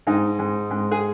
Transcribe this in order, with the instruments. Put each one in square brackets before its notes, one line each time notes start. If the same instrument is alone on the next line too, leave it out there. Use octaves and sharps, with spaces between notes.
[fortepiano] G#2 D#4
G#2
G#2
G#4